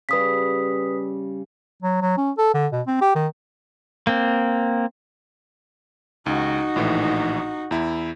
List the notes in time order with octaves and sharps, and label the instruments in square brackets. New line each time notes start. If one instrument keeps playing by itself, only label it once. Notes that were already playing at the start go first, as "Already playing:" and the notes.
[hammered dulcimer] C#3 G3 [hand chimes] B4 D#6 B6
[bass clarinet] F#3
F#3
C#4
A4
D3
B2
C4
G4
D#3
[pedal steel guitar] A#3 C4
[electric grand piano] C#2 [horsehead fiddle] D#4 F#4
[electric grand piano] A#1 A2 E3
E2 E4